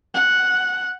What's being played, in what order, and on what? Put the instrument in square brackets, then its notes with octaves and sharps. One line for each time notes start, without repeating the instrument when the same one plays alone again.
[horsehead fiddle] F#5